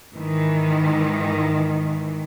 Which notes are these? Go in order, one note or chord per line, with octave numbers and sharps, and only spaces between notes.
G#2 D#3 E3